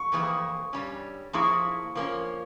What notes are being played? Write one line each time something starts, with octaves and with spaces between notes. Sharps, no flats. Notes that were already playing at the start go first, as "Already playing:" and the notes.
Already playing: C#6
F2 E3 A#3 E4 G#4
G2 G3 C#4
F3 A#3 E4 G#4 C#6
F3 A#3 C#4